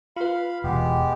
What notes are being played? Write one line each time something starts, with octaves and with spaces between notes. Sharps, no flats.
F4 B4 F5 B5
E1 G#3 B3 G4